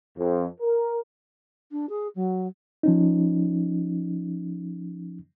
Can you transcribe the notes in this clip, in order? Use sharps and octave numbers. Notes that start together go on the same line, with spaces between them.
F2
A#4
D4
G#4
F#3
F3 C#4 D#4